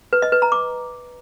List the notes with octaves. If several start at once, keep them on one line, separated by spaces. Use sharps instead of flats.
B4
D#5
B4
A#5
D6